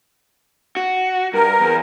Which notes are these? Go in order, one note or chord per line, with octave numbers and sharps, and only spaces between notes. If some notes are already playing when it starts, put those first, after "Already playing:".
F#4
G2 A#4
E2